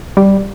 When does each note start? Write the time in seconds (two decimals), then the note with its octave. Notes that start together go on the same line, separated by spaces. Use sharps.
0.17 G3